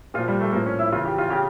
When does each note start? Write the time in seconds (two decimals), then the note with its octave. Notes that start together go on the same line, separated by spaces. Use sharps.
0.14 A#2 F4
0.18 F3
0.28 G3
0.40 A3
0.53 A2 F3 A#3
0.66 C#4
0.79 E4
0.92 C#3 E3 F4
1.05 G4
1.18 F4
1.30 C#3 G4